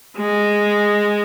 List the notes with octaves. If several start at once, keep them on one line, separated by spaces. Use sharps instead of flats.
G#3